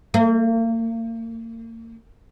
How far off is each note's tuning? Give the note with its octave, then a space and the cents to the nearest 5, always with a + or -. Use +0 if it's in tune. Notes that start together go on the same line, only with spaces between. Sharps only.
A#3 -40